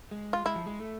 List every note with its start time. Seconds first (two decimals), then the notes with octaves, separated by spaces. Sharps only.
0.11 G#3
0.33 F4
0.45 G#3 E4
0.56 F3
0.66 G#3
0.79 A3